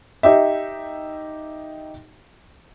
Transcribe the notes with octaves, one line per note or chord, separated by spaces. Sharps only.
D#4 G4 E5